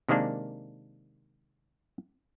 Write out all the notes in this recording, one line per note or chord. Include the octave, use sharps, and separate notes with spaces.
C3 D#3 G#3 A#3 D4